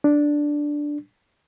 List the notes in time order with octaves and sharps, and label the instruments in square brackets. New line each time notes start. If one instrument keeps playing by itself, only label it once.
[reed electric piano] D4